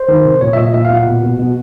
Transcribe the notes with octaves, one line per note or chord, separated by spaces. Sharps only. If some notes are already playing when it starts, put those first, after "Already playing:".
Already playing: C5
D#3
C3
A#2 C#5
E5
A#2 D#5
A#2 E5
F5
A#2
F#5
B2
B2
B2